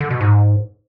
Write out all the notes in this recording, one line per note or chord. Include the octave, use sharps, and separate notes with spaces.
D3
B2
G#2